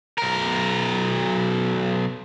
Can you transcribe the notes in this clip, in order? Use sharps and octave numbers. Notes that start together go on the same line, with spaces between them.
B1 A#4